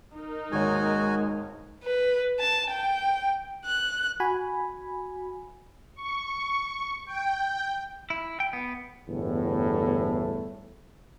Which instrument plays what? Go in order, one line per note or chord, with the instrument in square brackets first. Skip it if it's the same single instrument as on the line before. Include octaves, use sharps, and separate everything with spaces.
[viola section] D#4 A#4
[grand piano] G#1 D#2 C#5 [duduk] G#3 [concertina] F#4 G#5
[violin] B4
A5
G5
F#6
[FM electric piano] F#4 G#5 B5
[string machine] C#6
G5
[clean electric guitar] E4
G5
B3
[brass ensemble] G1 E2 A2